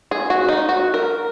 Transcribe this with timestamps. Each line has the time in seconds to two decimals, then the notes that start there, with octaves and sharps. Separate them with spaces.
0.11 G#4
0.30 F#4
0.49 D#4
0.69 F#4
0.94 A#4